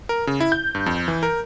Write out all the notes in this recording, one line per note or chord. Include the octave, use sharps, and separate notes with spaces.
A#4
C#3
E4
G6
G2
F2
E3
A#4